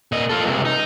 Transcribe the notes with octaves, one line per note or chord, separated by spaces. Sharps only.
A#2 D#5
F4 A4
C#2 C3
D#4